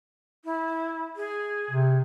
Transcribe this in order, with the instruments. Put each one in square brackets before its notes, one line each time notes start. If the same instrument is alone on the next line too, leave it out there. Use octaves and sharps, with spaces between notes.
[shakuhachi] E4
G#4
[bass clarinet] C3